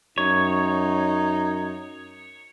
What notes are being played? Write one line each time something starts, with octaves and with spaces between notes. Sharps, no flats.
F#2 D#4 C#5